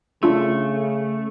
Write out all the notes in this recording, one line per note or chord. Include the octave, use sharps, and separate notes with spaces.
C#3 A3 D4 F4 E6